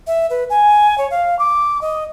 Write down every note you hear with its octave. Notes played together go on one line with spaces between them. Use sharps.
E5
B4
G#5
C#5
F5
D6
D#5